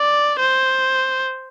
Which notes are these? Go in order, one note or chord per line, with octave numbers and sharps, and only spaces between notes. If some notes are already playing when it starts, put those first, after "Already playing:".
Already playing: D5
C5